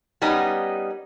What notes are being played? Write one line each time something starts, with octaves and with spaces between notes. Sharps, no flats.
G3 B3 C#4 D#4